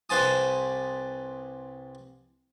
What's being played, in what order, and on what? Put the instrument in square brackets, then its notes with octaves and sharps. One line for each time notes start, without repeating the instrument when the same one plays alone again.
[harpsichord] C2 B4 C5 G#5 A5 D#6